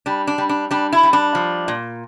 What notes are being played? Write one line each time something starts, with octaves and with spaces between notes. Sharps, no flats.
G3 D4
D4
G3
D4
G3 D4
E4
G3
D4
F3
A#2